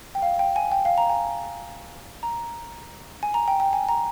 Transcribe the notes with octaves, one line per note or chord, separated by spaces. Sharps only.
G5
F5
G5
G#5
G5
F5
A#5
G#5
A#5
G#5
A#5
G5
G5
G#5
A#5